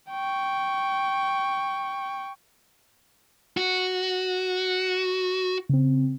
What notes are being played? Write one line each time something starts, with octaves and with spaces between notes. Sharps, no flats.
G5 C#6
F#4
C#3 C4